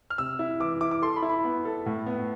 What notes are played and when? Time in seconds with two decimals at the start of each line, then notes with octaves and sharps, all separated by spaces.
0.10 F6
0.18 C3 E6
0.39 E4
0.60 E3 D6
0.81 E4 D6
0.91 D6
1.02 A4 C6
1.16 B5
1.22 E4
1.29 B5
1.44 B3
1.65 A4
1.86 A2
2.06 B3